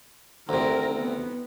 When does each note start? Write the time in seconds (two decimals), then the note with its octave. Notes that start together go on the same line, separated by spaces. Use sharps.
0.49 D2 C3 A#4
0.95 B3